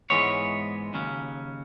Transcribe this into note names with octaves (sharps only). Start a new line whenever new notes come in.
G#2 E3 G#3 B3 C#5
D#2 C#3 F#3 C#4